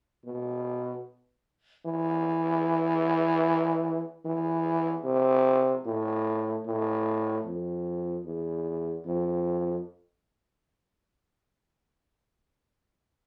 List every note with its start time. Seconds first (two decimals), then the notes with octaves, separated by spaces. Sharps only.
0.25 B2
1.85 E3
4.25 E3
5.05 C3
5.86 A2
6.66 A2
7.45 F2
8.25 E2
9.05 F2